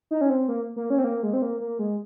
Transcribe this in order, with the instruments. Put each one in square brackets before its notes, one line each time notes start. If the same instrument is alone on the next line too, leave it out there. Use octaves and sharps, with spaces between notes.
[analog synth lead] D#4
C#4
C4
A#3
A#3
C#4
C4
A#3
G#3
C4
A#3
A#3
G#3